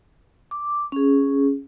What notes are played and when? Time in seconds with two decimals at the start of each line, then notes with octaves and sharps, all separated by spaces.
0.51 D6
0.92 C#4 G#4